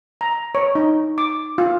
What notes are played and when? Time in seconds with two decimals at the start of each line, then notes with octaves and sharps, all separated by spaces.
0.21 A#5
0.55 C#5
0.75 D#4
1.18 D6
1.58 F4